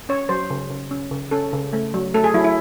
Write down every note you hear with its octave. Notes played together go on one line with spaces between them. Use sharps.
C#4 C#5
F#3 C5
C#3
C#3
C#4
C#3
C#4 A4
C#3
A3
F#3
A3 A4
G#4
F#3 E4
E4